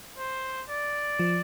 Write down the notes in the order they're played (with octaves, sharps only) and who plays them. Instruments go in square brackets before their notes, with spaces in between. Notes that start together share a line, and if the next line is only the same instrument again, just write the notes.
[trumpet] C5
D5
[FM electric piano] F3